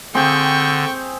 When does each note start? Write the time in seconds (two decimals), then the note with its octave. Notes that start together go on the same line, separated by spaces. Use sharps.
0.15 D3 C4 G#4 G5 C#6